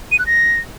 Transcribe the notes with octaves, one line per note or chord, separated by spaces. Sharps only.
D#7
F#6
A#6